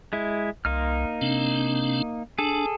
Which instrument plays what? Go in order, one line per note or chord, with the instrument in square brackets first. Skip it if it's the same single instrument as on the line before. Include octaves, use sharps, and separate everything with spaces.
[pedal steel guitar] G#3 E4
[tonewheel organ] C2 [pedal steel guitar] A#3 D#4 F6
[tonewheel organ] C3 C4 D4
[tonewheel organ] D4 [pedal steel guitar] G#4 A4